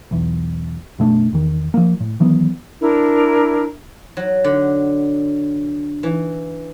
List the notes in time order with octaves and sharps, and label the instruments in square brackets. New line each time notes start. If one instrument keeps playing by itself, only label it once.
[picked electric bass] B1 E2
F#1 B2 A3 D4
E2 D#3
F3 A#3
A2
D#3 E3 F#3 B3
[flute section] D4 E4 A#4
[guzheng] F#3
D3
E3